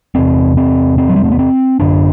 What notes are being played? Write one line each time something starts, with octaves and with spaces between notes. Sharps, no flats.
E2 C3 C4
C4
C4
F#3
G3
A3
B3
C4
F#2 D3 D4